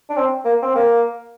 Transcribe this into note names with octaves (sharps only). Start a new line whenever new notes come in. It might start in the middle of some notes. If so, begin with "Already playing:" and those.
D4
C4
A#3
C4
A#3